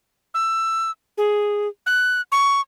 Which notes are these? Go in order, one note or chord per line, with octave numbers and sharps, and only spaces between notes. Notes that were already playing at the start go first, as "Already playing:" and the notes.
E6
G#4
F#6
C#6